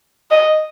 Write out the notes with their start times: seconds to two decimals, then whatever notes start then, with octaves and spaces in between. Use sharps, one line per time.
0.31 D#5